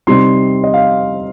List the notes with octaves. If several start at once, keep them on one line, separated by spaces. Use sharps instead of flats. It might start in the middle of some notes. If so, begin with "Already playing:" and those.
C3 G3 C4 D#4 C6
D#5
F5